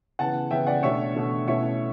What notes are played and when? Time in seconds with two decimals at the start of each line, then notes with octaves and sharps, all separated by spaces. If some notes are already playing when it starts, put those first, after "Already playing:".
0.19 C#3 E3 B3 F#5 A5
0.51 C#3 E3 B3 E5 G5
0.67 D5 F#5
0.83 B2 A3 D4 C#5 E5
1.16 B2 A3 D4
1.47 B2 A3 C#4 E4 C#5 E5